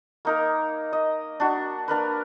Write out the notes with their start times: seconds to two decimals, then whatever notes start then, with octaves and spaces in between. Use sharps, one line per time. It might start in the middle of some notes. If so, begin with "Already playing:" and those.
0.25 A#3 D#4 A#4
0.93 D#5
1.40 D4 F#4
1.88 A#3 D4 A#4 B4